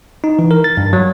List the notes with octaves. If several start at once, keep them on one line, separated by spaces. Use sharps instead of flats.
D#4
E3
A#4
A6
G2
F#3